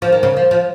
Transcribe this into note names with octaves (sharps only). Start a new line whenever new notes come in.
F3
D#3
C#3
F3
F3